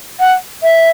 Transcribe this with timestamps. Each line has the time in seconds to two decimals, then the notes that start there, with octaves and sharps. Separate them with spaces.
0.20 F#5
0.63 E5